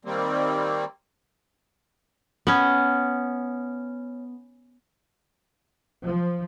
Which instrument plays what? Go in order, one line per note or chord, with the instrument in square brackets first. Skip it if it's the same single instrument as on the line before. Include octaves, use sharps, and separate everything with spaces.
[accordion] D#3 G3 A#3 C4
[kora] B3 C#4
[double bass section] F3